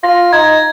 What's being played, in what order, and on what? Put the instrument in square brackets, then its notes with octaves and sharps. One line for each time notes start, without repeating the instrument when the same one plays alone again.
[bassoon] F4 [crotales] A#6
[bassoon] D#4 [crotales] G#6